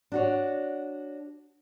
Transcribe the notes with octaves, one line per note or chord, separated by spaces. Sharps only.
D4 F#4 C#5